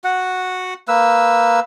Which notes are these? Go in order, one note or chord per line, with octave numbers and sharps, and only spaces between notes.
F#4 F#5
A#3 B4 E6